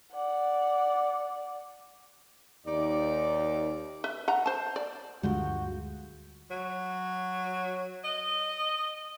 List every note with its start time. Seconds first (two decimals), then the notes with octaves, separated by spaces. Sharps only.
0.13 D5 F#5
2.66 D#2 D#4 D5
4.04 B4 E5
4.28 B4 F#5 A#5
4.46 C5 A5
4.76 D5
5.23 D2 G2 D3 G3 G#3 F4 F#4 G6
6.50 F#3
8.04 D#5